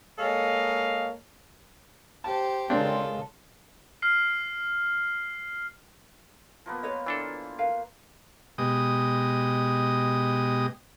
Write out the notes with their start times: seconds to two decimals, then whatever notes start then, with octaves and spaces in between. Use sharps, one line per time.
0.19 G#3 A#3 A4 C#5 D#5 F5
2.24 G4 C5 A5
2.70 C#3 G#3 C4 D4 F4 A4 A#4
4.02 F6 C7
6.66 F3 A#3 B3
6.83 B4 C#5 D#5
7.06 E3 D4 A4
7.58 A#4 B4 F5
8.58 B2 G#3 G4 D#5 D#6